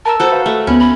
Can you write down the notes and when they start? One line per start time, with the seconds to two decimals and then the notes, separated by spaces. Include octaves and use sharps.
0.05 A#4 A5 A#5 E6
0.20 F#4 A4 C5
0.31 B4 F5
0.46 A3 A4
0.67 D2 B3 C#4 B5
0.80 B5